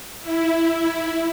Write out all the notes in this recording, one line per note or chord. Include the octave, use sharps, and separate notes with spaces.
E4